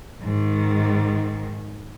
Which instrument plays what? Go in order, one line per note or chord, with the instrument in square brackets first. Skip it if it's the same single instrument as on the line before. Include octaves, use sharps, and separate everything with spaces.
[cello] G#2 D#3